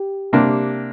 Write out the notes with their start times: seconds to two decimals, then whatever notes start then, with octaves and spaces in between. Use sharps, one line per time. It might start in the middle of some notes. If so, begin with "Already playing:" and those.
Already playing: G4
0.33 C3 G3 A#3 D4